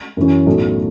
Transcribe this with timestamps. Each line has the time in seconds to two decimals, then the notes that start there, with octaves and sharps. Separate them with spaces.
0.17 F#2 E3 C#4
0.46 B1 A2 F#3 A3